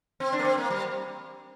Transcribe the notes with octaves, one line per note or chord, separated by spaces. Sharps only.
C4
D4
A#3
C4
A#3
G3